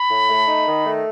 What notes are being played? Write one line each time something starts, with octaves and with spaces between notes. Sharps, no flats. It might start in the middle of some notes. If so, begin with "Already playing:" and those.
Already playing: B5
A2
A3
D#4
D#3
A3